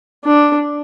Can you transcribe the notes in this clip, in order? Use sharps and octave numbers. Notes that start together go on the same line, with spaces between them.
D4